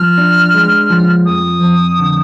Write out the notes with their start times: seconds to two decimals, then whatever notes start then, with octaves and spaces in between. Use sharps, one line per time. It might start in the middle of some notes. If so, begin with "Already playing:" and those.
Already playing: F3 F6
0.18 D4
0.54 G#3
0.90 F3
1.26 F2 D#6
1.62 F2
1.99 D3